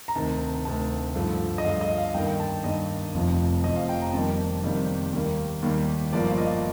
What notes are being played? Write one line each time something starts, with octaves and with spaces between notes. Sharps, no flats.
A#5
D2 C3 D#3 A5
D2 C3 D#3 A5
G2 D3 F3 A3
D#5
G2 D3 F3 A3 F5
D#5
F5
G2 D#3 A#3 G5
G5
A5
G2 D#3 A#3 D#5
F1 F2 C3 F3
F1 F2 C3 F3 D#5
F5
G5
A#5
F2 C3 D#3 G3 A#3 A5
F2 C3 D#3 G3 A#3
D#2 D#3 G3 A#3
D#2 D#3 G3 A#3
G1 G2 F3 A#3 D5
F5
D#5